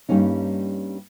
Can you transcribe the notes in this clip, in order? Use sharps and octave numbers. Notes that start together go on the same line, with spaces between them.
G2 G3 A#3 C#4 D#4